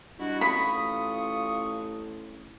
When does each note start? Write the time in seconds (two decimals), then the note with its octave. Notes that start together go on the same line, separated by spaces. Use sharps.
0.19 G2 D#4 E4 F#4
0.41 A1 F4 B5 C#6 D#6